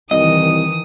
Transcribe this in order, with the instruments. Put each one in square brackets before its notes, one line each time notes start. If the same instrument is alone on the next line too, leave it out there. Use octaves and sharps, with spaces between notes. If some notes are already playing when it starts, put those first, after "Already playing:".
[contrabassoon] C2 [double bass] D#3 E3 [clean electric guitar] D#5 [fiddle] D#6